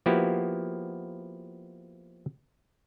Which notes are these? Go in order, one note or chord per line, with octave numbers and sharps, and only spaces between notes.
F3 A#3 B3 E4 F#4 G4